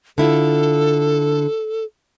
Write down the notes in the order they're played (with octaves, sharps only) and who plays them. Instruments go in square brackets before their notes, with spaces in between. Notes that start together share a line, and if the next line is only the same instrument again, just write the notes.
[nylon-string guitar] D3 E4 F4 [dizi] A4